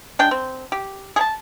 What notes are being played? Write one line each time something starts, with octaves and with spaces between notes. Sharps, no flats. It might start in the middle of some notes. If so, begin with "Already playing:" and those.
G#3 D4 G5
C4
G4
G#4 A5